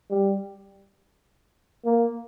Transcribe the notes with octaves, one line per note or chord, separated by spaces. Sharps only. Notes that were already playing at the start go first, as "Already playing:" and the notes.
G3
A#3